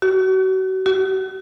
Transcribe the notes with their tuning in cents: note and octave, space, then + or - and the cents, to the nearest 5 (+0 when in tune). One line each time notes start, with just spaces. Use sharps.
F#4 +35
F#4 +40